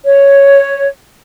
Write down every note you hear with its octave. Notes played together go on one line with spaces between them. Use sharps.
C#5